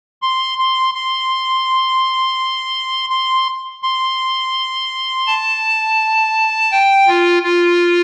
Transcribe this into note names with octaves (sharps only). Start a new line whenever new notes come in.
C6
C6
C6
C6
C6
A5
G5
F4
F4